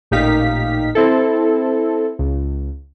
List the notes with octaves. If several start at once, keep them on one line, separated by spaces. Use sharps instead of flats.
A1 A#2 D#4 G4 F5 B6
C4 E4 A4
C#2